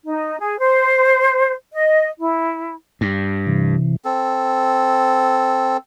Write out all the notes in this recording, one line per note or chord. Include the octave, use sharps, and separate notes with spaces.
D#4
G#4
C5
D#5
E4
G2
C3 E3
C4 A4